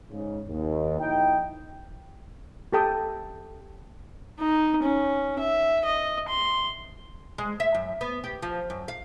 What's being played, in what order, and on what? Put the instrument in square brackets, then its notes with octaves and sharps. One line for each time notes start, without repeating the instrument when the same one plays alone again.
[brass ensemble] G#2 C#3
D#2
A#1 D#4 E4 G5
[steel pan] G4 A4 G5 D#6
[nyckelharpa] D#4
C#4
E5
D#5
C6
[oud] G#3
E5
F#2
B3
G4
F3
F#2
F5